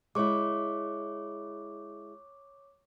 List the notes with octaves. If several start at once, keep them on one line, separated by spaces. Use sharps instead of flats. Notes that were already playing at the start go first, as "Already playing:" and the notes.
G#3 E4 C#5 C#6 D6